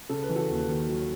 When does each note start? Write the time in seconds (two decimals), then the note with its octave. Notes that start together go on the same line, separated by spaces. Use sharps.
0.09 C#3 A4
0.23 B4
0.29 E3
0.36 F#4 A4
0.50 D#2
0.69 D#3
0.89 F#3